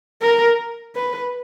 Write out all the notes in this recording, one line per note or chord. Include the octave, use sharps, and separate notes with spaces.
A#4
B4